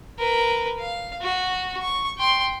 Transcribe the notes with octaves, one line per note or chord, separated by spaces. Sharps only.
A#4 B4
F5
F#4
C#6
G5 C6